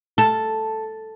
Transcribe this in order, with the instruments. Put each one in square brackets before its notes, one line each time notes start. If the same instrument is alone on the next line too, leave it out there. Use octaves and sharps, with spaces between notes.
[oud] A4